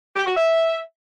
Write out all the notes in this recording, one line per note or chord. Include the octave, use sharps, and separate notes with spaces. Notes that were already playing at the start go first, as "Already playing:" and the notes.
G4
F#4
E5